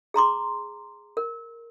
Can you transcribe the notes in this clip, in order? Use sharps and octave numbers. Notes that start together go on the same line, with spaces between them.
G#4 A#5 C6 D6
A#4